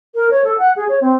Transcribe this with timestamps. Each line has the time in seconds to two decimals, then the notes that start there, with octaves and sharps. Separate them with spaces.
0.15 A#4
0.31 C#5
0.44 A4
0.58 F#5
0.76 G#4
0.89 C#5
1.01 C4